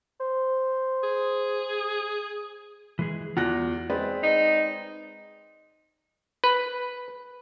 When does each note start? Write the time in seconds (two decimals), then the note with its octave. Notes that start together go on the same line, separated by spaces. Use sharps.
0.20 C5
1.03 G#4
2.99 E3 G#3 G#4
3.37 E2 F4 F#4 F#6 A#6
3.90 G#3 C4 B4 D5
4.23 D#4
6.44 B4